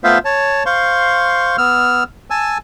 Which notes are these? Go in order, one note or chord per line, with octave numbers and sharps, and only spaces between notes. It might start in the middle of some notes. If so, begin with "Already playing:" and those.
A3 B3 F4 C5 E5 F5
C#5 A5
C5 F5 C6 C#6
B3 E6 F6
G#5 A5 E6